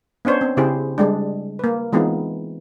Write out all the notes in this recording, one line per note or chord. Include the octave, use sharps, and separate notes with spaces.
B3 C#4 D4 C5 C#5
C4
C#3 C4 E4 G4 G#4 C5
G3 G#3 D4
A#3 B4
E3 G#3 B3 C4 D#4 F4